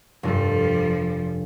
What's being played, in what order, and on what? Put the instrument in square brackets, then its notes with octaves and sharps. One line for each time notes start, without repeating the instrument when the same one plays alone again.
[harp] F1 D4 A4 [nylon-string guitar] G2 F4 [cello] F3 G3